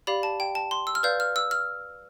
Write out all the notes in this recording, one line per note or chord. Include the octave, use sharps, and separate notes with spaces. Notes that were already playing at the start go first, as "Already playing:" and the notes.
G4 D5 F5 B5
A5
G5
A5
C6
E6
F6
B4 D5 F5 G6
F6
E6
F6